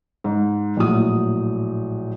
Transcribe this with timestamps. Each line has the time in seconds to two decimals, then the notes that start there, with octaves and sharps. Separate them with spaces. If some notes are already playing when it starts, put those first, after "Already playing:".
0.24 G#2
0.77 A#1 A2 F#3 D#6